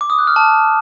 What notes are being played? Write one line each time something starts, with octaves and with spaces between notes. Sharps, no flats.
D6
D#6
F#6
F6
A5